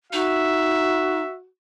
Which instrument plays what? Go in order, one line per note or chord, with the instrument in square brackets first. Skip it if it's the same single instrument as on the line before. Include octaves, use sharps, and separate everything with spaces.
[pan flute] D#4 [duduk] F#4 [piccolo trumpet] E5